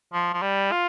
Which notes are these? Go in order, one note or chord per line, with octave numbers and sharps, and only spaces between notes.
F3
F3
G3
F4